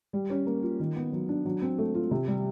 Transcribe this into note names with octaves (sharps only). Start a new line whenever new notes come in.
G3
C#4
A#3
F4
D#3
B3
F#3
D4
F#3
C4
A3
F4
C3
G3